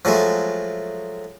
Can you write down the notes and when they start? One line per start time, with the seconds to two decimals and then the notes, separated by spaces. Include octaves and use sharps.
0.05 F3 F#3 G#3 A3